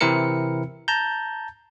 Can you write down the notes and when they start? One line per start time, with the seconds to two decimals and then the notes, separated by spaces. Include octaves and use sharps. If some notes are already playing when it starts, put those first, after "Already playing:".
0.01 C3 E3 C4 E4 A#4 C#7
0.88 A5 A#5 G6